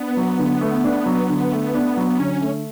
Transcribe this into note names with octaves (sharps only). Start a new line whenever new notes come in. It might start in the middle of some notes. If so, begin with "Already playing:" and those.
Already playing: B3 D4
F#3
D3
A3
D4
F#3
D3
A3
D4
F#3
D3 C#4
A3